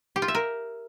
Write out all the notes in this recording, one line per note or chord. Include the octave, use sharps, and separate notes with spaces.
G4
F4
E5
A#4